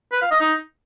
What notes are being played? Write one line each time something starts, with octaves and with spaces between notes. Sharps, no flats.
B4
F5
D#5
D#4